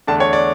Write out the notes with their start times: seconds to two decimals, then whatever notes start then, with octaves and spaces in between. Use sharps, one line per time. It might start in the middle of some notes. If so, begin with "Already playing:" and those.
0.07 E2 D3 A3 D4 A5
0.20 C#5
0.33 D5